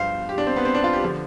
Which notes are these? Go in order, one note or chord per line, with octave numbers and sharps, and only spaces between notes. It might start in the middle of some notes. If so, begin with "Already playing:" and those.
Already playing: G1 G2 F3 C5 F5
G4
D4
C4
B3
C4
D4
F4
G4
D3 F3